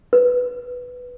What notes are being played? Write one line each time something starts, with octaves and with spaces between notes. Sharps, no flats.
B4